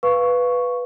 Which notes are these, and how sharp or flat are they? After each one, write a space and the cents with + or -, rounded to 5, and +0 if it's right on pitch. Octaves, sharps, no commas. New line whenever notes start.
B4 +0 F5 +0 C#6 +0